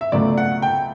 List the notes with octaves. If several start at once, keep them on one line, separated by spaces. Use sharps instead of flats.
E5
C#2 B2 F#3 A3 D5
F#5
G5